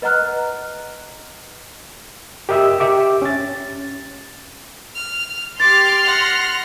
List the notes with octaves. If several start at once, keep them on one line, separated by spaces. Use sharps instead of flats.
B4 D#5 F#5 A#5 F6 F#6
G4 A#4 D#5 E5 E6
G4 E5 D6
C#4 A6
F6
G4 C6 D6 F6 A6
F#5 A#6